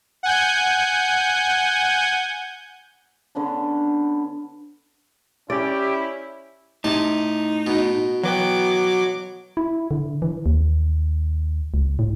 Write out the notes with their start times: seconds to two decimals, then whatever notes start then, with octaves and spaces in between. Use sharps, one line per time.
0.23 F#5 G#5 G6
3.35 D3 B3 C#4 D4
5.50 C#4 E4 G4 D5
6.84 A2 C3 D#4 A5
7.67 B2
8.23 E3 F#3 B3 B4 G5 D6
9.57 E4
9.91 D3
10.22 E3
10.46 D#2
11.74 C#2
11.99 A2